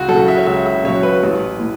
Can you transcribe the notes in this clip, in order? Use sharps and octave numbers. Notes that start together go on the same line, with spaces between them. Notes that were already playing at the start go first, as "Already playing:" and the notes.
Already playing: C#2 F#4
F#3 A4
C#3
E5
C#5
C#2 E5
E5
C#3 F#3 C#5
B4
A1
A2